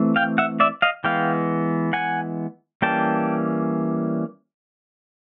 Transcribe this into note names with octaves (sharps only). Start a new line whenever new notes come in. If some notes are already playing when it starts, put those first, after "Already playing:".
Already playing: E3 A3 C4
F5 G5
E5 F#5
D5 E5
D#5 F5
E3 G#3 B3 F5 G5
F#5 G#5
E3 G3 A#3 C#4 G5 A5